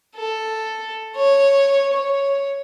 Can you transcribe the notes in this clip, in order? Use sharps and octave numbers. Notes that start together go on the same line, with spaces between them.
A4
C#5
C#5